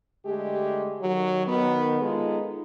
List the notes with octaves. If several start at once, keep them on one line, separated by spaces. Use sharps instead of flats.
D3 G#3 A3 G4
D#3 F#3
D#3 B3
G#3 B3 D#4 F4 A4